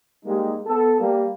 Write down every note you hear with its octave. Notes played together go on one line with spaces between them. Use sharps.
G3 G#3 A#3 D#4 G4
B3 A4
G3 A#3